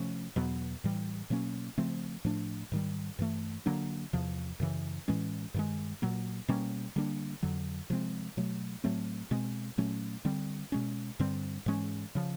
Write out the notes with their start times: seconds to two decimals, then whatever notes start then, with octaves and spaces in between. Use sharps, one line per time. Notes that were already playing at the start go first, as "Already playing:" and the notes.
Already playing: C3 F3 A3 C#4
0.36 E2 B2 F#3 B3
0.84 A2 E3 G3
1.30 B2 F#3 A#3 C#4
1.78 C#3 F3 A3 C4
2.25 A2 F3 A3 D4
2.72 G#2 D#3 G3
3.19 G2 E3 A3
3.66 D3 F#3 A#3 D4
4.13 E2 C3 F3
4.60 F#2 C#3 E3
5.08 A2 E3 G#3 C#4
5.54 G2 D#3 G#3
6.02 A#2 F#3 A#3
6.48 B2 G3 A#3 C#4
6.96 D3 G3 A#3 D4
7.43 F2 D3 F#3
7.90 C3 F3 G#3 C4
8.37 B2 F#3 A3
8.84 A2 F#3 A3 C4
9.31 B2 G#3 C4
9.78 A#2 F#3 A3 C#4
10.25 D3 G3 C4
10.72 B2 G#3 C#4
11.19 G2 D3 G3 C4
11.66 G#2 E3 G#3 C#4
12.15 C#3 F3